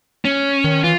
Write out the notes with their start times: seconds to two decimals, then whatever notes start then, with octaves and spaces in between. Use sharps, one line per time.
0.25 C#4
0.64 D#3
0.84 E3 F4